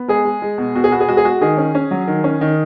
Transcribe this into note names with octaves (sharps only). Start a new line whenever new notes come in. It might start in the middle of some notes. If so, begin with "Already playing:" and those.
Already playing: B3
G#3 G#4
G#3
G#3
B2
B2 F#4
G#4
B3 F#4
G#4
G#3 F#4
G#4
G#3 F#4
D#3 G#4
C#4
C#4
F#3
D#3
C#4
D#3